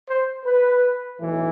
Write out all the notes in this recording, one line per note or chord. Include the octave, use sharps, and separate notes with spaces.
C5
B4
B1 A2 E3